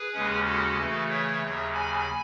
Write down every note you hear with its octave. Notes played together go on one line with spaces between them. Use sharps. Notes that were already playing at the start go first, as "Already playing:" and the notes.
Already playing: G#4 B4
D#2 C#3 G#3 C#4
F#4 A4
C#3 E3 A3
C#5 E5
D#2 C#3 F#3
G#5 B5